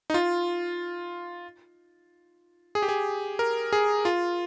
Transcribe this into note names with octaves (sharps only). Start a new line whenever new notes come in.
D#4
F4
G#4
G4
G#4
A#4
G#4
F4